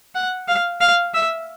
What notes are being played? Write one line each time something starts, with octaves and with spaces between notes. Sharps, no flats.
F#5
F5
F5
E5